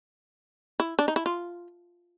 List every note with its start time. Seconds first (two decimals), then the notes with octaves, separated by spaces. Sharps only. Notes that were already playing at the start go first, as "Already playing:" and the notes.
0.80 E4
0.99 D4
1.08 D#4
1.16 E4
1.26 F4